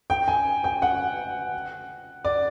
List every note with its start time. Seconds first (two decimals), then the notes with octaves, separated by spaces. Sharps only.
0.10 G5
0.28 G#5
0.64 G5
0.82 F#5
2.25 D5